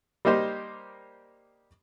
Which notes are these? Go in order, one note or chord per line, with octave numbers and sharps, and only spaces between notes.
G3 A#3 D#4 G4 C5